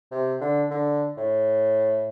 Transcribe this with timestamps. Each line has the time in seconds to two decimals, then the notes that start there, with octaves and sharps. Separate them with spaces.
0.11 C3
0.41 D3
0.71 D3
1.17 A2